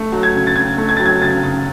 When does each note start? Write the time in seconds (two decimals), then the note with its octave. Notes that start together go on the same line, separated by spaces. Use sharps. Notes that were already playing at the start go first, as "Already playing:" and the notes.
Already playing: A3
0.12 F#3
0.23 G#6
0.34 C#3
0.47 A6
0.55 C#3 G#6
0.78 A3
0.89 G#6
0.97 F#3 A6
1.06 G#6
1.22 C#3 A6
1.43 C#3